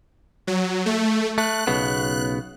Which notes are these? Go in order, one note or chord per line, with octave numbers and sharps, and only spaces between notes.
F#3
A3
A3 F#6
B1 C#3 B3